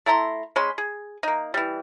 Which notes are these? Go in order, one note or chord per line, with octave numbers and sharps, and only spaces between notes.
A3 E4 A#5 C6
G#3 C#4 B5 C6
G#4
A#3 D#4
E3 G3